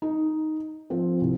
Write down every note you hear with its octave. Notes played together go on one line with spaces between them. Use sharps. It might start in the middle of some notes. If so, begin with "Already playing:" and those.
D#4
F3 C4
C2